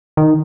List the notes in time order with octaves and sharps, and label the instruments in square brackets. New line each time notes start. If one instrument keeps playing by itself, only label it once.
[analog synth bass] D#3